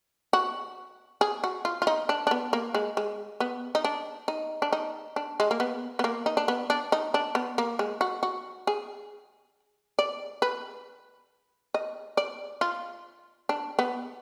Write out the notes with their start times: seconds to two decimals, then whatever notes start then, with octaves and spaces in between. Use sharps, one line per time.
0.33 F#4
1.21 G#4
1.44 F#4
1.65 F4
1.82 F4
1.87 D#4
2.09 D4
2.27 D4
2.31 B3
2.53 A#3
2.74 G#3
2.97 G#3
3.40 B3
3.75 D#4
3.84 D4
4.28 D#4
4.62 D4
4.73 D#4
5.16 D4
5.40 G#3
5.51 A#3
5.60 B3
5.99 B3
6.04 A#3
6.26 D#4
6.37 D4
6.48 B3
6.70 D4
6.92 D#4
7.14 D4
7.35 B3
7.58 A#3
7.79 G#3
8.01 F#4
8.23 F#4
8.67 G#4
9.99 D5
10.42 B4
11.74 D#5
12.17 D5
12.61 F4
13.49 D4
13.79 B3